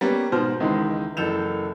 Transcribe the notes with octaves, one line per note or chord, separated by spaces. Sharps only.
G3 A#3 B3 C#4
G#2 B2 C5 F6
C#2 D#3 E3 G#3
F#1 E3 A4 G6 E7 F7